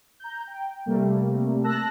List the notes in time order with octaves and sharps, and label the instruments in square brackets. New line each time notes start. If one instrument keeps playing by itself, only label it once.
[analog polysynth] A#5 G6
G5
C3 G3 A3 A#3
A5 E6 F#6 A#6